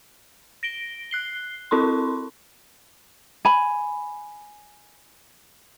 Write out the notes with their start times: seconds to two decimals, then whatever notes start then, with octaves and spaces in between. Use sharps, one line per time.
0.63 A#6 D7 G7
1.11 F#6 C7 G7
1.71 C4 E4 A4 B5 C6
3.45 G#5 B5